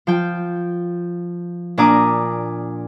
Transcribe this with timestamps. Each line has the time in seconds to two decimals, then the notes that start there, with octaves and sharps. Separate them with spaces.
0.07 F3 G5
1.77 A#2 D4 G#5 A#5 D6 D#6